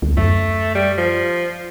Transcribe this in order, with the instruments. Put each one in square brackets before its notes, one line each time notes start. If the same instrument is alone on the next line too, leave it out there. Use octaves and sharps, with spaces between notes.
[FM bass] D2
[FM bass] F#2 [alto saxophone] A3
[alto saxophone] G3
F3